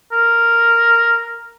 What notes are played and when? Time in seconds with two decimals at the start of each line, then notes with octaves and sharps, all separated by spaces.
0.12 A#4